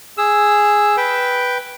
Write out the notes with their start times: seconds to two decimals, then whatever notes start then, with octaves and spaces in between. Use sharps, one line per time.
0.18 G#4 E6
0.97 B4 G5